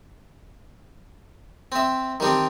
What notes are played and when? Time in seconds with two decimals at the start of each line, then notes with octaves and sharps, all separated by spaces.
1.72 C4 E5
2.20 D#3 G3 C4 D4